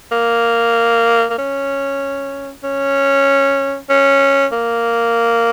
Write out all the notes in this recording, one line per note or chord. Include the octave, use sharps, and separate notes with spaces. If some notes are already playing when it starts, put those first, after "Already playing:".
A#3
A#3
C#4
C#4
C#4
A#3